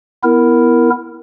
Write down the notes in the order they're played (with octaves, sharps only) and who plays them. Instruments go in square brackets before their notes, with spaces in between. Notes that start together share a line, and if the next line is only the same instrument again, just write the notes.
[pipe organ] B3 E4 A#4